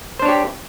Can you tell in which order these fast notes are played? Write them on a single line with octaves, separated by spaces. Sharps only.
C5 D4 C#5 G4